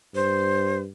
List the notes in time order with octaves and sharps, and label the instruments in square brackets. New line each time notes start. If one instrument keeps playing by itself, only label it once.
[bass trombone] G2 [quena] C5